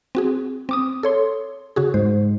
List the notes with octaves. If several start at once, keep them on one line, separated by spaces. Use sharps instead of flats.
C4 F#4 G#4
C4 D6 D#6
A4 C#5 C6
C#3 F#4 G#4
G#2 C5